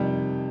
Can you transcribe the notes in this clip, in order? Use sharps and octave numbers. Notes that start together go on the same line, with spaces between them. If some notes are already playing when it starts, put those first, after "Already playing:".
Already playing: F2 C3 D#3 G3 G5